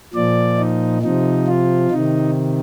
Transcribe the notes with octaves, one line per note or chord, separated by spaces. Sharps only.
A#2 F3 D5
D#4
C3 F3 D#4
F4
C3 D#3 D#4